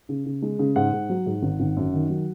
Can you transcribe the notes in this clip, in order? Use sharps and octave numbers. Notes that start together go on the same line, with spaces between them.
C#3
C#3
G#3
C#3
G#2 F#5
G#2
F#3
G#2
G#1
G#1
F#2
D#3
F#3